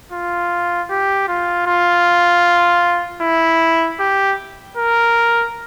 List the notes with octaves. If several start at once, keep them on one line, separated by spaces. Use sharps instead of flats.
F4
G4
F4
F4
E4
G4
A#4